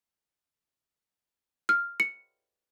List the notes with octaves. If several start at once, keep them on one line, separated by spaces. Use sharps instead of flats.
F6
C#7